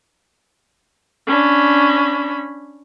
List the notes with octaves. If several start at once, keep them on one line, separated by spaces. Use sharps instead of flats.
C#4 D4 B5